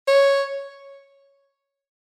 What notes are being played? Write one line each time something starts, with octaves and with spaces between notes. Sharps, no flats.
C#5